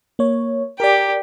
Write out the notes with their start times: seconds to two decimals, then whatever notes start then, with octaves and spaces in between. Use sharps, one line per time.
0.19 A#3 C#5
0.80 G4 A#4 D5